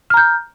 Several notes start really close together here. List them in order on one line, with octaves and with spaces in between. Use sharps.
F6 A#5 G6